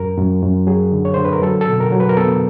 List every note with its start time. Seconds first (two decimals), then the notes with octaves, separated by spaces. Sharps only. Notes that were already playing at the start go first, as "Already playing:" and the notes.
Already playing: F#2 A#4
0.17 F#2
0.42 F#2
0.67 F#3 G#4
0.92 D3
1.05 C#5
1.14 D3 C5
1.24 B4
1.32 A#4
1.43 F#3 A4
1.61 A4
1.68 B2
1.80 A#4
1.92 F#3
2.00 B4
2.09 A#4
2.17 B3 A4